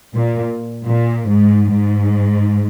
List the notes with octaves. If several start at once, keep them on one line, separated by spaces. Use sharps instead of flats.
A#2
A#2
G#2
G#2